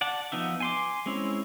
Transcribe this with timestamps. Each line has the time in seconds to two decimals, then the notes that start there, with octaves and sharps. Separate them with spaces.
0.01 D5 F#5 A5
0.32 F3 B3 D#4 E5
0.60 G#5 C6 D6
1.06 G#3 C4 C#4 E4